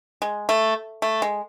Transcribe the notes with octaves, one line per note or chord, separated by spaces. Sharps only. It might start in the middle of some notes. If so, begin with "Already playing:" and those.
G#3
A3
A3
G#3